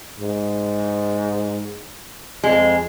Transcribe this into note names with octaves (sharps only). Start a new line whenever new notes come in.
G#2
F2 G#3